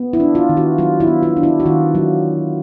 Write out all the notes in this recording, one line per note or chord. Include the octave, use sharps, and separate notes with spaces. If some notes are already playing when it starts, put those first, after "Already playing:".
Already playing: B3
E4
D4
F4
D#3
F#4
F#3 F4
E4
B3
F4
D4
E4
F#4
D#3 F4
F#3